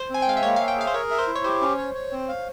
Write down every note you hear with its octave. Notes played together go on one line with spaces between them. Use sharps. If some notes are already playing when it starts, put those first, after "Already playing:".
Already playing: C5
C4 G#5
G5
G#3 F5
E5
A#3 C#5
F5
E5
G5
G#4 F5
C5
A#4 C#5
E5
C5
E4
C#5
G4 C5
C#4
C#5
C#5
C4
F5